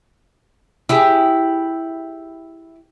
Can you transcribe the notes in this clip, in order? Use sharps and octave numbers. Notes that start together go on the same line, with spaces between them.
E4 G4 G#4